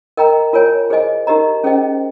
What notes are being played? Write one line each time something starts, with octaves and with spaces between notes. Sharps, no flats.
A#4 D#5 G5 A#5
F4 A#4 C#5 G#5
G#4 C5 D#5 G#5
D#4 G4 A#4 D#5 A#5
C#4 G#4 C5 D#5 G5